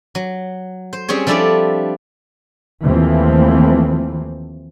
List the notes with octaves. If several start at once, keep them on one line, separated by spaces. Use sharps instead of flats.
F#3
C5
G3 C4 C#4 G#4 C#5
F3 G3 D4 E4 A4 D5
D#2 E3 F3 A3 C4